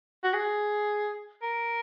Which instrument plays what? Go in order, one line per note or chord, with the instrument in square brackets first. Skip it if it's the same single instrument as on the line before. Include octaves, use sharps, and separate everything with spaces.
[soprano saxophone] F#4
G#4
A#4